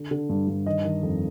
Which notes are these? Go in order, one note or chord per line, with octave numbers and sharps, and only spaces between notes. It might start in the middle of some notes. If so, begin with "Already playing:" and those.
Already playing: D3
D3
G2
G2
D#3 D#5
D#3
F2